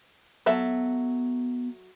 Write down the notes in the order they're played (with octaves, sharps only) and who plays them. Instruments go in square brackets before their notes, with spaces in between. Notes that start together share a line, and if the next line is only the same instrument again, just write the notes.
[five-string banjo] F#3 A4 E5 [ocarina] B3